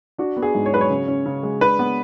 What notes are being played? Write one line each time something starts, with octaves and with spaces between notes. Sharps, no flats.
D4 F#4
B3
G#4
G#2
C#5
F#3 B4
C#5
C#3
C#4
C#3
G#3
D4 B4
B3